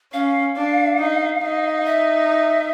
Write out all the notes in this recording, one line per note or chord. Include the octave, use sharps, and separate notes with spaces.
C#4 F5
D4
D#4
D#4
E5